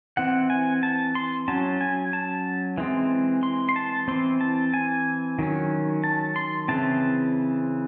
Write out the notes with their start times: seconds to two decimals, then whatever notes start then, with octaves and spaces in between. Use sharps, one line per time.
0.17 E3 C4 F#5
0.50 G#5
0.83 A5
1.15 C6
1.48 F#3 C#4 A5
1.81 G#5
2.13 A5
2.78 E3 G#3 C4
3.43 C6
3.69 C6
3.76 A5
4.08 E3 C4 C6
4.41 A5
4.74 G#5
5.39 D#3 F#3 C#4
6.04 A5
6.36 C6
6.68 C#3 E3 C4 A5